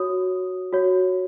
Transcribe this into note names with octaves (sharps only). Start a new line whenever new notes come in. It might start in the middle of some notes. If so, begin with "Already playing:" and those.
Already playing: F#4 C#5 D#6
F#4 C#5